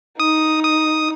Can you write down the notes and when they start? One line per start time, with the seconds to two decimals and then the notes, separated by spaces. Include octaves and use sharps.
0.20 D#4 D#6
0.63 D#6